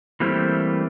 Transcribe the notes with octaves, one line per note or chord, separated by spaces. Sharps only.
E3 G3 A3 A#3 C4